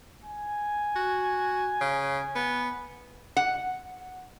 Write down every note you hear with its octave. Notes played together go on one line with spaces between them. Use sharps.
G#5
F#4
C#3
B3
F#5